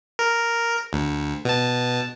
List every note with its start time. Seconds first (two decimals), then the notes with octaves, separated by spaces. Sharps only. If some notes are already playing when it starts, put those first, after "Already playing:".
0.19 A#4
0.93 D2
1.45 B2 A5